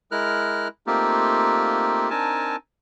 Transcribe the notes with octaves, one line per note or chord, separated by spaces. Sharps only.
G#3 E4 A#4 F6 F#6
A3 A#3 C4 D#4 F4 G4
C4 D4 D#4 A#4 G#5 A5